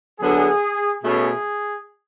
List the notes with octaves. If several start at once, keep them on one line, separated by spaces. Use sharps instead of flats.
D3 F#3 B3 D4 G#4
B2 A3 C#4 G#4